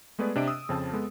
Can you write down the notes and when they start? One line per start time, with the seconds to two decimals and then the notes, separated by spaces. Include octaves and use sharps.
0.19 G#3 A3 B3 G#4 B4 D5
0.36 C3 D4 D#5 E5 D7
0.48 D#6 E6
0.69 F2 C#3 C4 F4 A5
0.93 G#3 B3 A4